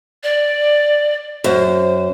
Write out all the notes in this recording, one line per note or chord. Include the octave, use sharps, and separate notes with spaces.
D5
F#2 C5